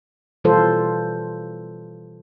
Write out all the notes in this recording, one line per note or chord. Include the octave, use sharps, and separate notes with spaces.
B2 E3 G3 F4 A4 C5